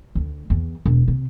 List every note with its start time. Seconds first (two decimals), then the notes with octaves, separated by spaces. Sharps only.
0.15 D2
0.50 E2
0.85 E1
1.08 C3